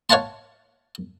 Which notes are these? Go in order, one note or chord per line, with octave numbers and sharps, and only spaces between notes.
C#5 F5 F#5 A5 C6